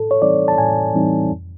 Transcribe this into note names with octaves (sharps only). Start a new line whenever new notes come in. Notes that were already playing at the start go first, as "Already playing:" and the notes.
Already playing: A2 A4
C#5
E3 G3 C4 D#4 D5
A5
A2 G#5
E3 G3 C4 D#4
F2